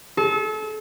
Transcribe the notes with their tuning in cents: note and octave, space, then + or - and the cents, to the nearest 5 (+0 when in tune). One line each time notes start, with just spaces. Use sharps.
A4 -35